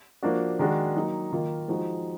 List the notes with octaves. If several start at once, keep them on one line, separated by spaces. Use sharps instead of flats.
F3 A#3 D4 F#4
D#3 G#3 D4 F#4
F#3 A#3 D#4
D#3 A#3 F4
F3 G#3 D#4 F#4